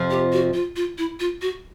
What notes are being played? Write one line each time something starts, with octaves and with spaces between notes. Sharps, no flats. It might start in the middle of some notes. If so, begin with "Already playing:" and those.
Already playing: F2 C3 F3
G4
F#4
F4
F4
E4
F4
F#4